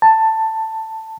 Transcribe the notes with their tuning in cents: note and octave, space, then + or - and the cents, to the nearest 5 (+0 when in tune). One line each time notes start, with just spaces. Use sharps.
A5 +10